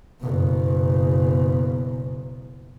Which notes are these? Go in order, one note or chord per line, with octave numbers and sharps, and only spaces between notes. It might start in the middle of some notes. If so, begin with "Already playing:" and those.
F#1 B2